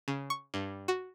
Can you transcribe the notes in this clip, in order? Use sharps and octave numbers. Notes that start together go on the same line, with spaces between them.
C#3
C#6
G2
F#4